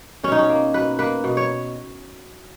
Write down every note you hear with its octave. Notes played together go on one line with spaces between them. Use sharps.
B2 C#4
D#4
C#4
A#3
B2 B4
A#3 B4
B2
C#5